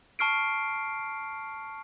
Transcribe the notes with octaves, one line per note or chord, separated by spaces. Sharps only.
A5 C#6 F6 C7 D7